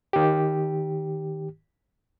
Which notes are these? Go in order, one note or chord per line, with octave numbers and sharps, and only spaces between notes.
D#3 G4